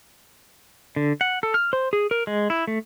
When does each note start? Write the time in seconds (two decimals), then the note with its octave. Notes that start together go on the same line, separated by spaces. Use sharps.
0.96 D3
1.21 F#5
1.43 A4
1.54 F6
1.73 C5
1.93 G#4
2.11 A#4
2.27 G#3
2.50 E4
2.67 A3